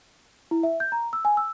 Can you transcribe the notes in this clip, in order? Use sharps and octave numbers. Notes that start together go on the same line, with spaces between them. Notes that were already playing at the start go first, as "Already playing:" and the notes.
E4
E5
G6
A#5
E6
G#5
E6